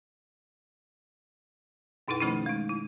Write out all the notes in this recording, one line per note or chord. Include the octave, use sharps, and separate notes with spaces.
F#2 B2 D#4 E4 B4 F#5
D#3 F3 A3 C#4 D#4 E4
G#3 D#4
E4